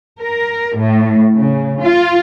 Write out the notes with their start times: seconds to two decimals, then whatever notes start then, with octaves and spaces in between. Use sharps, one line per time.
0.19 A#4
0.75 A2
1.34 C#3
1.79 F4